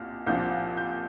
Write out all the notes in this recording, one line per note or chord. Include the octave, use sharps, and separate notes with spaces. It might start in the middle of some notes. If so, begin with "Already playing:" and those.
Already playing: C2 A#2 F6
C2 A#2 F3 G6
G6